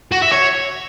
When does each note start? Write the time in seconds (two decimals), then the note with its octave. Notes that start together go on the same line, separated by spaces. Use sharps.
0.12 F#4
0.22 E5
0.32 C#5